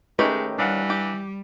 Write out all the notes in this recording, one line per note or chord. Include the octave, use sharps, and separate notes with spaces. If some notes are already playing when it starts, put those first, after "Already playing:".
D#3 G#3 A3 C#4 D#4 G4 B4
E3 G3 D4 F5 F#5
G4